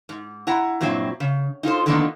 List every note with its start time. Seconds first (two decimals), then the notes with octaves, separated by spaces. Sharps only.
0.09 G#2
0.47 E4 F#5 A#5
0.81 G2 A#2 F#3 C4 E4
1.20 C#3
1.63 D#4 F4 A4 C5
1.86 D3 D#3 F3 A#3 B3 D#4